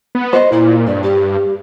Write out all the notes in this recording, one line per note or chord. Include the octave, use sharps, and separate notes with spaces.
B3
C5 D#5
A#2 E4
G2 D5
G4